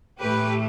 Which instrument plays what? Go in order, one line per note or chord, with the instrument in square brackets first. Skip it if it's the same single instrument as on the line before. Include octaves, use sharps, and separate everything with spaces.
[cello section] A2 E3 A3 G4 B4